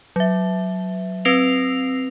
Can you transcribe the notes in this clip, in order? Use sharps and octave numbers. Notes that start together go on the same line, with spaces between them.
F#3 E5
C4 B4 E6 A#6 C7 F7